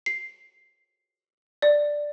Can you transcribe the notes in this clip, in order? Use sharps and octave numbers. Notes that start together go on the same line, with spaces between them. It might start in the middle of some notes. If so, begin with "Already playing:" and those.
C7
D5